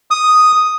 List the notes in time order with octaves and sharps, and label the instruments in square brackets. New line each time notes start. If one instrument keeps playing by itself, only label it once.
[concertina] D#6